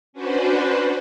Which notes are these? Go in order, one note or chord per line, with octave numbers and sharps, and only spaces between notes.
C#4 D4 F#4 B4 C5